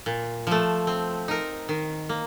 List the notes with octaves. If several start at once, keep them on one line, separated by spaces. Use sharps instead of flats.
A#2
F3 A3
C4
D#4 A#4
D#3
A#3